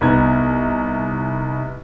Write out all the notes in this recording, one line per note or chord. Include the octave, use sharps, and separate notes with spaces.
C2 B3 D#4 G#6